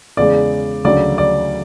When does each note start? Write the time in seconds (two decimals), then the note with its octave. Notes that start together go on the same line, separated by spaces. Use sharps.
0.17 E2 C#3 G#3 D5
0.84 D2 C#3 F#3 D5
1.18 D5